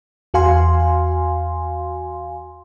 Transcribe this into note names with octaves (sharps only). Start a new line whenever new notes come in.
E2 F#4 F5 G#5 C6